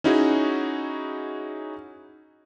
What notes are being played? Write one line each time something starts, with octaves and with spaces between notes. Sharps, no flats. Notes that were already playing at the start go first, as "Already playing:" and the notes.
C#4 D#4 E4 F#4 G#4